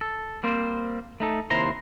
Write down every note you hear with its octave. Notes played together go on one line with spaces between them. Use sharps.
A4
G3 A#3 C4 C5
A3 D#4 A4
D#2 C3 E4 C5 A#5 C6